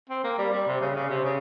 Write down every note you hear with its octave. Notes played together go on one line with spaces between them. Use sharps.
C4
A#3
G3
G3
C3
C#3
C#3
C3
C#3